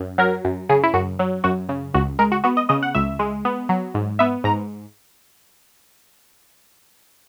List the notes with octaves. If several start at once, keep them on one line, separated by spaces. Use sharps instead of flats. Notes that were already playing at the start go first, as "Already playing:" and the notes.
Already playing: F#2
F#3 A#4
F#2
C#3 G#4
E4
F#2 F#4
F#3
F#2 F#4
C#3
C#2 F#4
G#3 A#4
F#4
B3 F#4
D#5
C#3 D#5
F#5
C#2 E5
G#3
B3
F#3
G#2
B3 E5
G#2 A#5